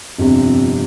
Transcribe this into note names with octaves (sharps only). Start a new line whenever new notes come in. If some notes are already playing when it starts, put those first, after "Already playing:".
G1 F2 C3